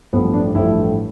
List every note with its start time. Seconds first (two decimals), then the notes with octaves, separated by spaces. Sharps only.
0.13 A1 G2 F3 A3 B3
0.34 D4
0.55 A1 G2 F3 A3 E4